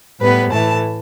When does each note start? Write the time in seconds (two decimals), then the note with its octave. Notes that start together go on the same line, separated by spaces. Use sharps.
0.20 A2 G3 B3 B4
0.51 A2 E3 A3 A5